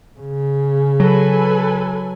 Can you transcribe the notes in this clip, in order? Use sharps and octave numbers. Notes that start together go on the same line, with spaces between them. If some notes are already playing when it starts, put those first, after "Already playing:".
C#3
F#3 A4 B4 G#5